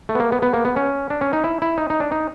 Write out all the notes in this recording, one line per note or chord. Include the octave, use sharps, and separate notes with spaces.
A3
B3
A#3
B3
B3
A#3
B3
C#4
D4
C#4
D#4
E4
E4
D#4
D#4
D4
D#4